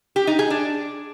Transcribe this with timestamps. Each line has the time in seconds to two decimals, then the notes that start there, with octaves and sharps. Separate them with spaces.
0.16 G4
0.27 D#4
0.39 G#4
0.50 D4